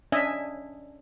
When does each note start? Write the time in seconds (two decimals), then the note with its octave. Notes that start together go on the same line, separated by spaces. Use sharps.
0.12 C#4 D4 D#5 E5 G#5